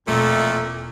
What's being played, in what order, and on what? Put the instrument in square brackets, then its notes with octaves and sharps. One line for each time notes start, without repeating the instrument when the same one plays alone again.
[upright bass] E1 [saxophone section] F2 A#2 A3